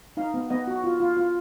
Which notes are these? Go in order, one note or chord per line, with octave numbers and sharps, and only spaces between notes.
D#4 F5
B3
B3 D#5
F#4
F4
F4
F4